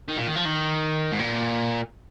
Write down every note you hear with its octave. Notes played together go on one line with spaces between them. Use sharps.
D#3
A#2
D#3
F3
D#3
G#2
A#2